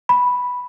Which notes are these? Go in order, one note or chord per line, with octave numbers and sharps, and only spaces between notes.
B5